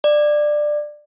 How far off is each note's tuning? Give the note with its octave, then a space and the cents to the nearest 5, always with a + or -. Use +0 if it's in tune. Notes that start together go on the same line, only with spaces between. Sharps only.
D5 +15